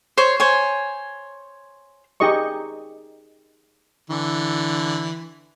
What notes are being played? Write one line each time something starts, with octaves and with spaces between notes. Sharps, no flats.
C5 C#5
C5 C#5 G#5
D#4 G4 G#4 D#5 C#6
D3 E3